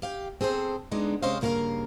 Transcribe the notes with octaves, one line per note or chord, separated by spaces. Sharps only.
G4 F5 G5
C4 G#4 A4 C5
D3 G#3 B3 D4 D#4
C3 G#3 C#4 C5 D#5 F5
G2 C#3 A#3 F#4 A#4 F5